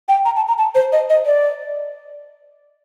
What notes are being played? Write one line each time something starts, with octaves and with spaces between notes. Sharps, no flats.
G5
A#5
A5
A#5
A5
C5
D#5
D#5
D5